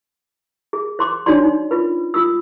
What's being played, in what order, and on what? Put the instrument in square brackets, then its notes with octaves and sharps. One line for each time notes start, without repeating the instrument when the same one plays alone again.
[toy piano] G#4
C5 C6 D6
D4 D#4 F#4 C#5 D5 C6
D#4
F4 B4
F4 D#6 E6